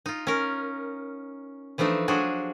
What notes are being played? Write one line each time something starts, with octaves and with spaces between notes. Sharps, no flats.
D#4 F4
C#4 A#4
E3 F3 A3 D4 D#4
F3 F#3 D4 F#4 G#4